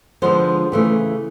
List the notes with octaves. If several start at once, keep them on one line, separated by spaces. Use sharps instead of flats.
D3 F3 G#3 B3 D4 C5
C#3 E3 A3